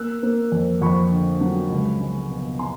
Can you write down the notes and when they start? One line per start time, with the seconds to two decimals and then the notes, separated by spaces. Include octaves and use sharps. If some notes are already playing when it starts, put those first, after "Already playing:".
Already playing: A#3 E6 F#6
0.23 A#3
0.52 F2
0.82 F2 B5 C#6
1.11 D3
1.41 F#3
1.71 C#2
2.00 G#3
2.30 B2
2.59 B2 A#5 C6